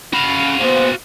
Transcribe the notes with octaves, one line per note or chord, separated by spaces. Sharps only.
C#4 F#4 F5 B5
A#2 B3 C5